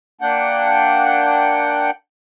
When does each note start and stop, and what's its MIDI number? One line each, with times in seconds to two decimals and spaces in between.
0.21 1.91 58
0.21 1.91 62
0.21 1.91 78
0.21 1.91 79